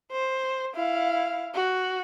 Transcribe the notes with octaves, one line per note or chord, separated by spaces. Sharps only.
C5
E4 F5
F#4